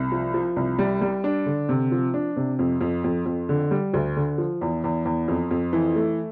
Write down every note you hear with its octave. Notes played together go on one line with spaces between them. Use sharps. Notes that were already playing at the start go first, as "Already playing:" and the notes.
Already playing: C2
F3
F3
C2
G3
G3
D4
D3
C3
F3
D4
C3
F2
F2
F2
F2
D3
G3
D2
D3
F3
E2
E2
E2
F2
F2
E3
A3